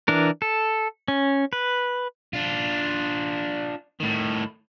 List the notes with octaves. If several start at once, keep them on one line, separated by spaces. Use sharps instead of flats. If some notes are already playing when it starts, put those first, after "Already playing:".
E3 D4 A#4
A4
C#4
B4
D4 F4
A2 D#3